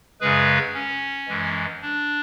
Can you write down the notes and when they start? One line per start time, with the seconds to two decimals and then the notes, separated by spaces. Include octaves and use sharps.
0.20 F#2 C#3 G#3 G#4 B4
0.75 C#4
1.28 F#2 E3 G#3
1.82 D4